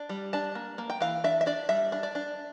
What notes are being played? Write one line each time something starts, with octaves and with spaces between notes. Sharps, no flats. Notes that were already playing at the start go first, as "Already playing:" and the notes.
Already playing: D4
G3
D4 A5
A#3
A#3
G5
E3 F5
D4 E5
E5
D4 D5
G3 E5
D4
D5
D4